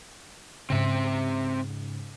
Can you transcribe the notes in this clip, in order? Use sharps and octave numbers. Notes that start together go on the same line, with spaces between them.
G#2 C#3 C4 E5